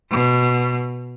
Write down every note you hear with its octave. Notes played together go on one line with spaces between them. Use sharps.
B2